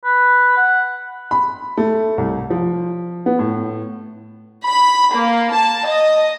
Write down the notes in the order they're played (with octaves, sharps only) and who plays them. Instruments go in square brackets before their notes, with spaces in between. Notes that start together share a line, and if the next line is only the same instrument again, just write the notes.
[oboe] B4
F#5
[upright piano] B5
A3
C2
F3
B3
A2
[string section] B5
A#3
A5
D#5